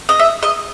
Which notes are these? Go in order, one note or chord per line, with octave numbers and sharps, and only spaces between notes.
D#5
E5
D#5